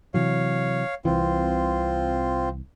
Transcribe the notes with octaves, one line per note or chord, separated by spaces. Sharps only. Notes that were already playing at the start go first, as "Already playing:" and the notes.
C3 E3 F#3 C#5 F5
C2 C3 E3 C4 F4